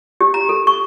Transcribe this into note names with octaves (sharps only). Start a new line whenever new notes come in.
G4
A#5
A4
C#6